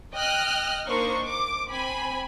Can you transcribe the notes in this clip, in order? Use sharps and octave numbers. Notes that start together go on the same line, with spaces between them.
D#5 G5 F6 F#6
A#3 D4 D#4 C5 C#6
D6
C4 G#5 B5